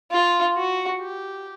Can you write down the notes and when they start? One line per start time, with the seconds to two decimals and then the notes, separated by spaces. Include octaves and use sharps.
0.11 F4
0.56 F#4
1.00 G4